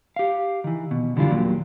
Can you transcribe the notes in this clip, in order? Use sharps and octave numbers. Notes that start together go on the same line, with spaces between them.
G4 F5
D#3 E3
B2
F#2 D3 E3 G3 D4 F4
D#2 A#2 F#3